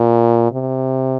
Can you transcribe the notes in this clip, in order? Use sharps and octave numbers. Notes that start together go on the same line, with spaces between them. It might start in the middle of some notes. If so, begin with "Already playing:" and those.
Already playing: A#2
C3